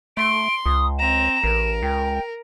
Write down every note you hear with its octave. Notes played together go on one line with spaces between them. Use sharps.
A3 C6 D7
C#2 D#6
C4 A#5 E7
A1 A#4
C#2 G5